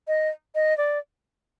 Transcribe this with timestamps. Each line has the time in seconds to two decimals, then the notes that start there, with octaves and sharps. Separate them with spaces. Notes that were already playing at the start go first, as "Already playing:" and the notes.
0.08 D#5
0.55 D#5
0.78 D5